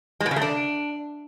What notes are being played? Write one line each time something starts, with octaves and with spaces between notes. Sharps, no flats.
G#3
B2
C#3
A3
D4